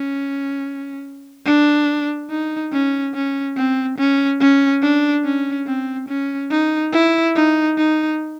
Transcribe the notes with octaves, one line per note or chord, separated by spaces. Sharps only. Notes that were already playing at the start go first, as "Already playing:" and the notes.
Already playing: C#4
D4
D#4
C#4
C#4
C4
C#4
C#4
D4
C#4
C4
C#4
D#4
E4
D#4
D#4